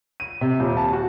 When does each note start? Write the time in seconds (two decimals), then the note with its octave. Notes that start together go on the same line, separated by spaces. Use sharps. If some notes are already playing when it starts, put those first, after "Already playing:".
0.20 D#7
0.41 C3
0.60 D#1
0.77 A5
0.93 F#4